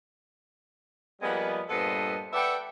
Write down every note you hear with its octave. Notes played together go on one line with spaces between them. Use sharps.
F3 G3 G#3 A#3 B3
G2 A#2 B3 A4 C5 D#5
A4 B4 D5 E5 F#5 G5